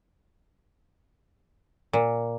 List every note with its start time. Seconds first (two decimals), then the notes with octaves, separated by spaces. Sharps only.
1.93 A#2